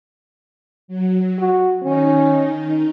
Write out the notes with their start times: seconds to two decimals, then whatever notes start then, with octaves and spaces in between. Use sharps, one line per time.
0.88 F#3
1.39 F#4
1.83 D#3 C#4 D#4